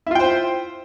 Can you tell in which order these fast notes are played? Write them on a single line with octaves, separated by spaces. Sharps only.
E4 F4 G5 C5